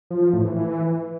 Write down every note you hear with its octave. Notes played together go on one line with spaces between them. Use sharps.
F3
F3
A2
E3
E3